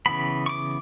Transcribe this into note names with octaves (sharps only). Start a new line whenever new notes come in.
C#3 E3 B3 B5
C#6
D6